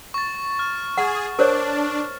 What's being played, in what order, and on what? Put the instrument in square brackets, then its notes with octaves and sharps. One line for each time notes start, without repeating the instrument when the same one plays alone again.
[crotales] C#6 A6
F6
[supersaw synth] G#4 [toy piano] F#5
[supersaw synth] D4 [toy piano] A#4 C5 C#5